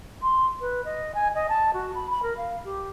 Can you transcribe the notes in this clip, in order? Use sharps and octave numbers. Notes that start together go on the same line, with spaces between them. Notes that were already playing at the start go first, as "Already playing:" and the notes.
C6
B4
D#5
G#5
D#5
A5
F#4
B5
B5
A#4
F5
G4